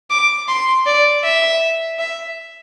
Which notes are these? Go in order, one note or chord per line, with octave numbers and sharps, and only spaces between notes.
D6
C6
D5
E5
E5